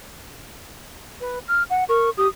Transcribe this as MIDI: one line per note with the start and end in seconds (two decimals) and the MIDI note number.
1.20 1.39 71
1.48 1.63 89
1.70 1.84 78
1.89 2.10 70
1.89 2.10 85
2.17 2.27 67
2.17 2.28 87